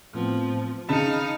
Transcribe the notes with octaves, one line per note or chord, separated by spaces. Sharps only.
A2 F3 B3 C4
C#3 D#4 F5 A5 B5 C#7